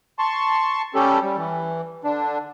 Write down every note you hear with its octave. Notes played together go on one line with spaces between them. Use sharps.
A5 C6 C#6
G3 A3 C#4 G4 A4
G3
E3
D3 D4